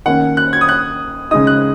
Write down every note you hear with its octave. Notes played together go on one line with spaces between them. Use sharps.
D#3 A#3 C#4 F#5
F#6
G#6
D#6
F#6
C#3 G#3 D#4 D#6
F#6